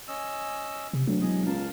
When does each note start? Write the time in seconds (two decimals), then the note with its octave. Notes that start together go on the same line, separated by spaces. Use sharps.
0.08 C#4 D#5 E6
0.93 C3
1.07 D2 F#3
1.21 E1 G#4 D#5
1.46 C#2 A#4 F5 A5